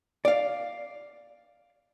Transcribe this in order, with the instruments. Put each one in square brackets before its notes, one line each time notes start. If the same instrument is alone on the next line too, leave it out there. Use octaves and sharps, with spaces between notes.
[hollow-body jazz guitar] D5 F5